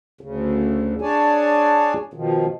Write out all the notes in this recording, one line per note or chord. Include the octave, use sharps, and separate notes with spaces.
D2 C#3
D4 G#4 C#5 D5 G#5 A5
B2 D#3 F3